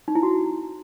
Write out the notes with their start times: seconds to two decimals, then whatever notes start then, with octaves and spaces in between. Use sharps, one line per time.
0.08 D#4
0.15 E4
0.23 F#4